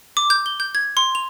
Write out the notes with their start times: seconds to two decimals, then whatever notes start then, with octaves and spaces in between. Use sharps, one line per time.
0.17 D6
0.30 G6
0.46 G7
0.60 G6
0.75 G#6
0.97 C6
1.15 F7